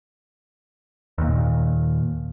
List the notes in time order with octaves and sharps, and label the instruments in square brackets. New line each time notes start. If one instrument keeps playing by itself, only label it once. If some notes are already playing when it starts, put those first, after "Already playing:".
[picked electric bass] D#2 A#2